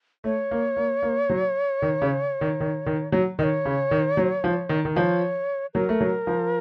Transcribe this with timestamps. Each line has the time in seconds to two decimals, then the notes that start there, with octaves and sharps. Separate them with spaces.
0.24 A3 C#5
0.51 A#3
0.77 A#3
1.03 A#3
1.30 F#3
1.82 D#3
2.02 C#3
2.41 D#3
2.60 D#3
2.86 D#3
3.12 F#3
3.39 D#3 D#5
3.44 C#5
3.65 C#3
3.91 D#3
4.17 F#3
4.44 F3
4.69 D#3
4.85 D#3
4.96 F3 C#5 D#5
5.74 F#3 A#4
5.89 A3
6.01 F#3
6.27 F3